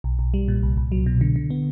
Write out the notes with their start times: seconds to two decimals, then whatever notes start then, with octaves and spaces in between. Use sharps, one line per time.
0.04 B1
0.19 B1
0.34 G3
0.48 A#2
0.63 C2
0.77 C2
0.92 F#3
1.06 B2
1.21 D3
1.36 D3
1.50 B3